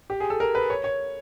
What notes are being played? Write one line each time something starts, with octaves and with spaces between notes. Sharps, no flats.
G4
G#4
A4
A#4
B4
C#5
C#5